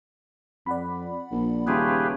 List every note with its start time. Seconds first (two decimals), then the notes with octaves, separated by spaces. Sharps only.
0.66 F2 D5 F#5 B5
1.32 A#1
1.67 D#1 C#3 A3 F4 G4 G#4 B4